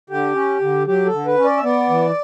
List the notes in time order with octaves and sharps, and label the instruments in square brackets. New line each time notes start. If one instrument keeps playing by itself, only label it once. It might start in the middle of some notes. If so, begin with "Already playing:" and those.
[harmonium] D3 G4
C#4
D3
F#3 G4
A4
D3
B4
C#4
D5
E5
B3 D5
E3